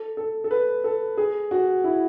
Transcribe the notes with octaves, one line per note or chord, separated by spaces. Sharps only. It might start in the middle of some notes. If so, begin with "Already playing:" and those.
Already playing: A4
A4
A4
B4
A4
G#4
F#4
E4